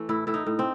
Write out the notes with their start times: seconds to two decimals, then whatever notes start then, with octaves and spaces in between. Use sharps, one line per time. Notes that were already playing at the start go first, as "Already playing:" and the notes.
Already playing: E3 A3
0.09 A2 E4
0.27 A2 E4
0.34 D#4
0.46 A2
0.59 C4